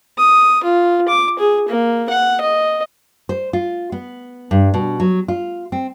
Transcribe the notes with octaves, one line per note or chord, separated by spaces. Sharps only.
D#6
F4
D6
G#4
A#3
F#5
D#5
C5
F4
B3
G2
B2
F#3
F4
C4